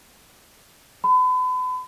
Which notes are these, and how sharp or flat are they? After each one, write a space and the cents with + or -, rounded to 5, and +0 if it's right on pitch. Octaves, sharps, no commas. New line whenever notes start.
B5 +40